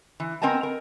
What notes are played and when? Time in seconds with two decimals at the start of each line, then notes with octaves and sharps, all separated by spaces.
0.20 E3
0.42 B3 C4 A#4 D#5 G#5 A5
0.63 A#4